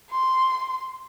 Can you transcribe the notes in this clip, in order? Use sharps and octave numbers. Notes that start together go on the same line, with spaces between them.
C6